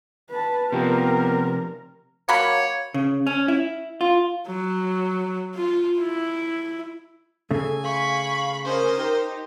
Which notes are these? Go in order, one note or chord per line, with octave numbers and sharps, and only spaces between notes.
B4 A5
C3 F3 B3 F4 G4 A#4
F#3 A#3 C#5 B5
C#3
C#4
E4
F4
F#3
F4
E4
C#3 A3 A4 G#5
F5 B5 C#6
C#4 A#4 C5 D#5
D#4 G4